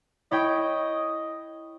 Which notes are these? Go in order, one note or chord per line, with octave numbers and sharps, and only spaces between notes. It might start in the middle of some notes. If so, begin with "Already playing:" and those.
E4 C#5 D#5 G5